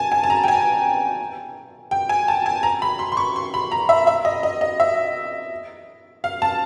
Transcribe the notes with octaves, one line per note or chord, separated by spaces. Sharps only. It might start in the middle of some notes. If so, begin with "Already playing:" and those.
Already playing: G#5 A5
G#5
A5
A#5
G5
G#5
G5
G#5
A5
G#5
A#5
B5
C6
C6
C#6
C6
B5
A#5
E5
E5
D#5
D#5
D#5
E5
F5
A5